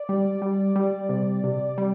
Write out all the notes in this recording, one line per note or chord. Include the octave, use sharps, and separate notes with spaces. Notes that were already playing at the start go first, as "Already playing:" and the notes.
Already playing: D5
G3
G3
G3
C3
C3
G3